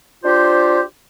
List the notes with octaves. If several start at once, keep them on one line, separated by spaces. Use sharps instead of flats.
D4 F4 G4 C5